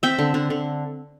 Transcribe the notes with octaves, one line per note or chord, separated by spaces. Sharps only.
C4 E5 G5
D3
D3
D3